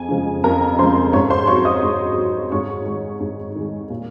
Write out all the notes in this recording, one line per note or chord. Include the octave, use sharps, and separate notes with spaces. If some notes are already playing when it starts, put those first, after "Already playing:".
Already playing: F2 G#4 G#5
C#3 F3 G#3
F2 A#4 A#5
C#3 F3 G#3 C5 C6
G#2 C#5 C#6
C5 C6
F#3 C#5 C#6
D#5 D#6
G#2
F#3
G#2 C#5 C#6
D#3 G#3
G#2
D#3 G#3
A#2